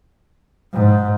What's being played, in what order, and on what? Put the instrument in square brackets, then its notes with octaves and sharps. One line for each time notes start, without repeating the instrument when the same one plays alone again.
[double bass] G#2